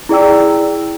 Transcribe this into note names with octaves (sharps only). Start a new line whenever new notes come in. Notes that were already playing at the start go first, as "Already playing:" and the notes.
E4 G#4 D5 G5 E6